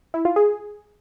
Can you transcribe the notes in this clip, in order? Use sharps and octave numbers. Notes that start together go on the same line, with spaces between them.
E4
F4
G#4